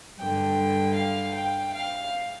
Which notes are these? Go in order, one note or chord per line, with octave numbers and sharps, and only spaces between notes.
G2 D3 G5
F5
G5
F5